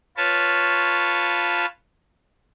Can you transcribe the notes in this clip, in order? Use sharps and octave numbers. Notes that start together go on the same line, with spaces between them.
F4 B4 C#5 A5